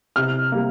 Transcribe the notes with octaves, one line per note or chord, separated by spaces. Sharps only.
C3 F6
G3 A#3